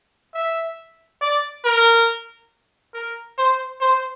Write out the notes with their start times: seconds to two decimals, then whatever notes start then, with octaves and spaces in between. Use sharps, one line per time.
0.34 E5
1.22 D5
1.65 A#4
2.94 A#4
3.38 C5
3.81 C5